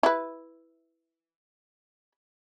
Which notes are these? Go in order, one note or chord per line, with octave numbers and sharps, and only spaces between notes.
E4 B4